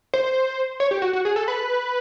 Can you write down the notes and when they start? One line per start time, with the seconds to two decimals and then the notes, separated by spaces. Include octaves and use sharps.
0.14 C5
0.80 C#5
0.91 G4
1.02 F#4
1.13 F#4
1.25 G#4
1.36 A4
1.48 B4